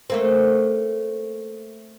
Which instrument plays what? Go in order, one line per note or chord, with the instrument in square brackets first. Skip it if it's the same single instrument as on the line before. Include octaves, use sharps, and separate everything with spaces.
[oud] A3 A#3 C4